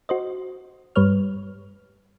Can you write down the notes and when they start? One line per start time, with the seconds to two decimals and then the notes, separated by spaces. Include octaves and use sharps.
0.09 F#4 C5 D#5
0.96 G2 G3 B4 C#5 F6